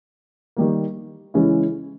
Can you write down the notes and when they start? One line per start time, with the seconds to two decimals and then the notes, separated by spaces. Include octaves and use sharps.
0.57 D#3 G3 A#3
1.34 C#3 E3 G#3 C#4 E4